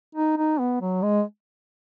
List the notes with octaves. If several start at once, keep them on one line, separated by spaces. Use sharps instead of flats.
D#4
D#4
B3
F#3
G#3